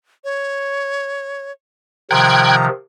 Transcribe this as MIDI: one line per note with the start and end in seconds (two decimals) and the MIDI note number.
0.24 1.52 73
2.11 2.69 48
2.11 2.69 51
2.11 2.69 53
2.11 2.56 79
2.11 2.66 82
2.11 2.56 90
2.11 2.56 92